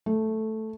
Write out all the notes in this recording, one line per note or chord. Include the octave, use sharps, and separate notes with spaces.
A3